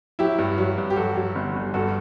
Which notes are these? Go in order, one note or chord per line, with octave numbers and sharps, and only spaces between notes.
F#3 E4 G4
G2
F#3
G2
G4
F#3 F#4 A4
F#3
G1
G1
G2 F#4 A4